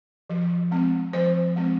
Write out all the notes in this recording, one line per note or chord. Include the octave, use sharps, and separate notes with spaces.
F3
G#3 C4
F3 C5
G#3 C4